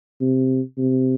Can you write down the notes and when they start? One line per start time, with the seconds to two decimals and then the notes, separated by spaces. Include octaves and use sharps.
0.21 C3
0.78 C3